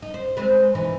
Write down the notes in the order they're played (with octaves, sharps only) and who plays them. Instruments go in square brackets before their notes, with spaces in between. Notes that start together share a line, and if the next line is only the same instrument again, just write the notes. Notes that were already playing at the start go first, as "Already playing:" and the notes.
[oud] D#4
C5
G#3 C4 B4
B2 E3 D#4